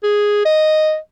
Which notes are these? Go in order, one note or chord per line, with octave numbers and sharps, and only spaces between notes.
G#4
D#5